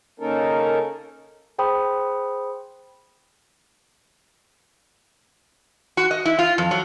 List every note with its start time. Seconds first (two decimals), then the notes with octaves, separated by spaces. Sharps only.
0.20 C#3 A#3 C#4 D#4 A4 A#4
1.58 G#4 C5 G5 B5 C6 D#6
5.97 F#4
6.11 D#5
6.25 E4
6.39 F4
6.58 F2
6.71 F#3